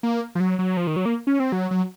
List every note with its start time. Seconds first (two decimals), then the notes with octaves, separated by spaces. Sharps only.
0.03 A#3
0.35 F3
0.40 F#3
0.59 F#3
0.77 F3
0.87 D#3
0.96 F#3
1.06 A#3
1.27 C#4
1.40 C4
1.52 F#3
1.71 F#3